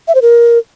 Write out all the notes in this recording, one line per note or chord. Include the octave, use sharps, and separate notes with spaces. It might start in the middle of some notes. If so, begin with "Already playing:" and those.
E5
C5
A#4